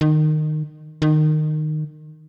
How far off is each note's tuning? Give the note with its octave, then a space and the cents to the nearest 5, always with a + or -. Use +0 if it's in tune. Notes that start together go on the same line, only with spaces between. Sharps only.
D#3 -20
D#3 -20